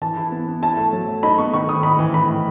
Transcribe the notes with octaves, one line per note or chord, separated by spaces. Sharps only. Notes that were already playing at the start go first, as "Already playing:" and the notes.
E3 A5
E4
B3
B3
E4 A5
A3
F#3
A3
D#4 B5
B3 C#6
D#3 C#6
D#3 D#6
A2 B5
E3
E3 B5
A2